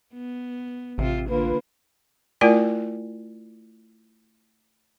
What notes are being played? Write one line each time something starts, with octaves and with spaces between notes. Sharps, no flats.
B3
A1 C3 F4
D3 A#3 F4 B4
A3 E4 F4 A#4 D5 G#5